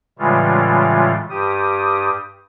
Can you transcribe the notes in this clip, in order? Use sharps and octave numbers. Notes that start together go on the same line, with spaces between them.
A2 C#3 E3 G3 G#3 F4
G2 G4 D#6